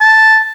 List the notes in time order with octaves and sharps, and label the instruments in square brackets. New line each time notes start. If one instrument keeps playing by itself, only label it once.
[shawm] A5